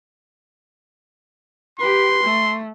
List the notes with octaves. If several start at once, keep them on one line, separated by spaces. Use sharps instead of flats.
G4 B4 C6
A3